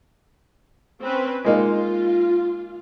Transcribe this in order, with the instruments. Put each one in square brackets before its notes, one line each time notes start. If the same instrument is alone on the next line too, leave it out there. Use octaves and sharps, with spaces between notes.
[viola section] C4 C#4 B4
[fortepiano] G#3 A#3 D#4 [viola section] F4